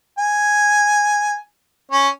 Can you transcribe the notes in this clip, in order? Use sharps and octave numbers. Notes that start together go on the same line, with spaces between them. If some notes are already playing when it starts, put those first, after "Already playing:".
G#5
C#4